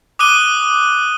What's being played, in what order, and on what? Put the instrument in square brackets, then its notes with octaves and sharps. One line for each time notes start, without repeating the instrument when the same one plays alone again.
[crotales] D6 D#6 F#6 D#7 G7